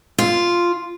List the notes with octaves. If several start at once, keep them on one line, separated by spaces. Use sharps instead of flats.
F4